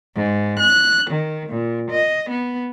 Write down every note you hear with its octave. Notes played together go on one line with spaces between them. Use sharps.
G#2
F#6
D#3
A#2
D#5
B3